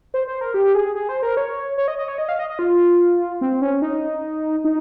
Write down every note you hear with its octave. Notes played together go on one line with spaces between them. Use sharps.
C5
C5
A#4
G4
G#4
G#4
C5
A#4
C#5
C#5
D#5
D#5
C#5
D#5
F5
D#5
D#5
F4
C4
C#4
D#4
D#4